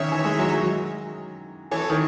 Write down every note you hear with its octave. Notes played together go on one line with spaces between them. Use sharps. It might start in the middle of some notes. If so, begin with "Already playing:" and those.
Already playing: D#3 C#4 D#4 C#5 E5
E3
G#3
F#3
F#3
E3 A4 C#5
D#3